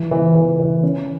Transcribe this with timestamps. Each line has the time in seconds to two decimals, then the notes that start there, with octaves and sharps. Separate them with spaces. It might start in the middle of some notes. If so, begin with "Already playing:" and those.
Already playing: E3
0.11 E3
0.35 E3
0.60 E3
0.83 C#4